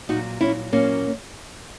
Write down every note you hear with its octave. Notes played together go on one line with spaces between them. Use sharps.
A#2 F#3 D#4 F#4
A#2 F#3 C#4 E4
A#2 F#3 A#3 C#4